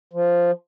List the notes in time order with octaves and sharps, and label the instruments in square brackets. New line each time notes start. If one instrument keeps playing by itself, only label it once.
[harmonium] F3